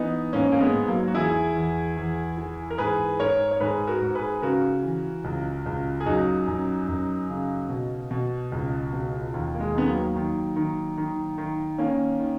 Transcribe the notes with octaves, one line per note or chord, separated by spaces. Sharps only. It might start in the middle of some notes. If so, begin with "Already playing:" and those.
Already playing: E3 B3 D#4
G#2 A#3 C#4
A#3
G#3 B3
G#2
F#3 A#3
F#4
E2 E4 G#4
E2
E2
E3
A#4
G#2 G#4 B4
G#2 A#4 C#5
C#5
G#2 G#4 B4
F#4 A#4
G#2
G#4 B4
C#3 F#4 A#4
E3
C#2
C#2
G#4
F#2 D#4 F#4
F#2
F#2
C#3
B2
B2
C#2
B2
D#2
A#3
G#3
D#3 B3
F#3 A#3
D#3
D#3
D#3
D#3
D#3 A#3 C#4
D#3